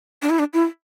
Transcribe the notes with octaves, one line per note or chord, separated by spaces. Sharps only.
D4
E4
D4
E4